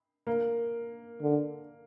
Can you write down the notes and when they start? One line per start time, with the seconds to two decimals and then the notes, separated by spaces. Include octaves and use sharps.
0.27 A#3
1.22 D3